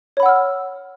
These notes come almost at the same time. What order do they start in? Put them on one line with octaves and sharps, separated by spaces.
C#5 B5 F#5 E6 F6